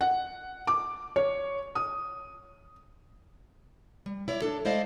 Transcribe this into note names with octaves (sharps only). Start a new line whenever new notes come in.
F#5
D6
C#5
D#6
G3
E4 C#5 D5
D4 A4
G#3 E4 C5 D5 D#5 F5